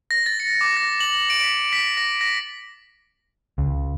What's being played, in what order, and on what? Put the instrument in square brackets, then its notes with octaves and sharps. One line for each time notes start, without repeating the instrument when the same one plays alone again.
[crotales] A#6
A6
C#7
D6
A#6
F#7
D7
B6
B6
A#6
A#6
[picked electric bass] C#2